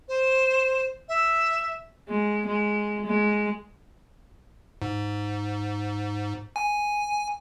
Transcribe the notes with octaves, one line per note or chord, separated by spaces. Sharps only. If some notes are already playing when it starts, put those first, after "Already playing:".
C5
E5
G#3
G#3
G#3
G#2
G#5